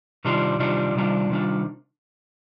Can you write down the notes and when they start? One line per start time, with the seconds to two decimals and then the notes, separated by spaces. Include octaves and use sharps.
0.25 C3 D#3 G3 D4 F4
0.59 C3 D#3 G3 D4 F4
0.95 C3 D#3 G3 D4 F4
1.30 C3 D#3 G3 D4 F4